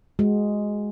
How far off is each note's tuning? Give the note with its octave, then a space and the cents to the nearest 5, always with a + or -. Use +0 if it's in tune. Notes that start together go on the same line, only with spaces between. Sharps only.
G#3 +0 F#4 +10